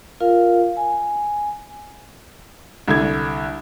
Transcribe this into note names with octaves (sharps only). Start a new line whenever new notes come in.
F4 A#4 F5
G#5
C2 D3 G#6